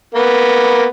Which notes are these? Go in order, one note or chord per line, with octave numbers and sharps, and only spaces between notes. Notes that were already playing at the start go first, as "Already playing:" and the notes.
A#3 B3